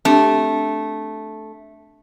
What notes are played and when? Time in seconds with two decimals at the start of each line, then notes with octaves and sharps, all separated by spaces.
0.05 A3 C4 D4 G4